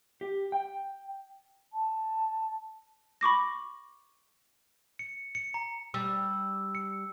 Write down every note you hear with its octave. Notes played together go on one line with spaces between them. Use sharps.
G4
G5
A5
B5 C#6 D6 A#6
C#7
C#7
A#5
G3 E6
C#7